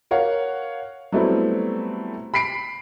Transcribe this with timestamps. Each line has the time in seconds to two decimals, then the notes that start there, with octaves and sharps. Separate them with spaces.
0.11 A#4 C#5 F5 F#5
1.12 F#3 G3 A3 B3 C4 E4
2.34 B5 B6 C7 D7